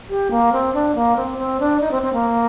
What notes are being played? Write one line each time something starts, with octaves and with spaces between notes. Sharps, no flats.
G4
A#3
C4
D4
A#3
C4
C4
D4
D#4
C4
C4
A#3